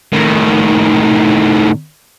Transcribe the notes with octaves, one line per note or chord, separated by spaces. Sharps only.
A2 D#3